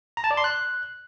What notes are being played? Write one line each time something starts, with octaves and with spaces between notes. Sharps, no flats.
A#5
A5
D5
C6
F#6